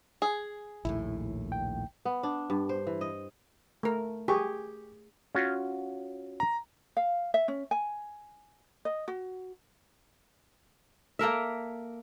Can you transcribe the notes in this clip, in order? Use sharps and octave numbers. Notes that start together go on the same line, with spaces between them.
G#4
A#1 D#2 A2 E4
G5
B3
D4
G2
C5
E3
D#5
A3 A#4
G4 G#4 C#6
C#4 F4 F#4
A#5
F5
E5
C#4
G#5
D#5
F#4
A#3 A4 A#4 E5